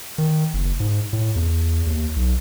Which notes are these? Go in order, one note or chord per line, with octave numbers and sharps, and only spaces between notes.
D#3
F#1
G#2
A2
E2
D#2
B1